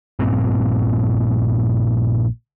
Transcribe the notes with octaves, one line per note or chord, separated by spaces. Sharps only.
A#1 G2 A#2 C4